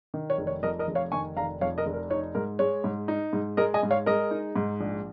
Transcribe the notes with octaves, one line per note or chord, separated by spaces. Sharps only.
D#3
C#5
F1
C#5
F2 A#4 D#5
A#4 D#5
F1
C#5 F5
D#3 G#5 C#6
F1 F5 A#5
F2 C#5 F5
A#4 D#5
F1
A#4
D#4 C#5
G#2 A#4
G#3 C#5
G#2
D#4
G#2
G#3 A#4 D#5
D#5 G#5
G#2
C#5 F5
G#3 A#4 D#5
D#4
G#2
A#1